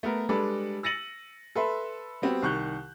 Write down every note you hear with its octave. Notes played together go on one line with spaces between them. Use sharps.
A3 B3 A#4
G3 G#3 D4 A4 B4 D5
E6 A6 A#6 C#7 D#7 F#7
A4 B4 E5 C6
G3 B3 C4 F#4
C2 D#3 C#6 F#6 G6